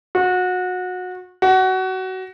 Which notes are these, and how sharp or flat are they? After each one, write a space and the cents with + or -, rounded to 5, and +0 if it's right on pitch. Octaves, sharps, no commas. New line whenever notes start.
F#4 -25
F#4 +20